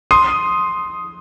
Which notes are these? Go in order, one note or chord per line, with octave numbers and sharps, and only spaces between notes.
C6 D#6